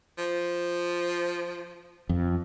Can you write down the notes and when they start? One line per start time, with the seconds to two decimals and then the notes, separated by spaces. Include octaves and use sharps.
0.18 F3
2.09 F2